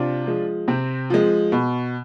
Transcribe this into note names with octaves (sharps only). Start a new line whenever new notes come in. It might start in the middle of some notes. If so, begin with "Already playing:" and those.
Already playing: C3 D4 F4
F3 G#3
C3 C4
F3 G#3
B2